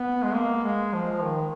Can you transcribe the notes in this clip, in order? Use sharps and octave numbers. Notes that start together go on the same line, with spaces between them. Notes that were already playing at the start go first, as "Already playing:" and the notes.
Already playing: B3
G#3
A#3
G#3
F3
D#3